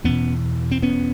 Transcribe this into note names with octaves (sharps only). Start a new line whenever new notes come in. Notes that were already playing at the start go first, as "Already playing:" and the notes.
E2 B2 B3 C#4
C4
B3 C#4